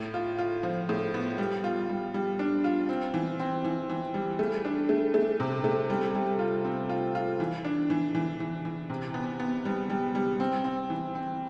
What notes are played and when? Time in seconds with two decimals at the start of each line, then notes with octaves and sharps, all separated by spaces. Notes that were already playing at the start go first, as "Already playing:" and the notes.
Already playing: A2
0.14 F4
0.38 F4
0.63 F3
0.89 A2
1.14 B3
1.38 G3
1.64 F4
1.89 G3
2.14 G3
2.39 D4
2.64 F4
2.89 C4
3.14 E3
3.40 C4
3.64 E3
3.90 E3
4.14 G3
4.39 A3
4.65 D4
4.89 A3
5.14 A3
5.40 C3
5.64 A3
5.90 G3
6.15 G3
6.39 F4
6.65 C4
6.89 F4
7.15 F4
7.40 E3
7.65 D4
7.90 E3
8.15 E3
8.40 E3
8.65 E3
8.90 C3
9.14 B3
9.40 B3
9.65 G3
9.90 G3
10.15 G3
10.40 C4
10.64 C4
10.90 E3
11.15 C4